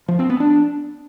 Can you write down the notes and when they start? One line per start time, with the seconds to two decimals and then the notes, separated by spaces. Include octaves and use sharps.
0.08 F3
0.19 C4
0.30 B3
0.40 D4